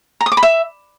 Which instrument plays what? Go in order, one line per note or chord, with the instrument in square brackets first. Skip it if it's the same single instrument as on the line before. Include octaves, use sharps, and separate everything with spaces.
[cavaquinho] A#5
D#6
D6
B5
E5